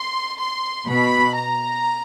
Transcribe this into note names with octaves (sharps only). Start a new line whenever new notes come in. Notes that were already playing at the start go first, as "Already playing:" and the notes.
Already playing: C6
C6
B2 B5
A#5